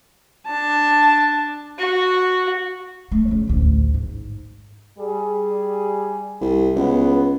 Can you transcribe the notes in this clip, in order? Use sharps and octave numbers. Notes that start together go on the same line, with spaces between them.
D4 A5
F#4
A3
C#3 C#4
A1 D2
G#2
G3 G#4
C2
C#2 B3